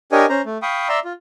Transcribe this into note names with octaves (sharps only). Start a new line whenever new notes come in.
D4 G4 A#4 C#5 D#5 G#5
C#4 C5 A#5
A3
F5 G5 B5 C#6 D#6
D5 E5 A#5 C6 E6
F4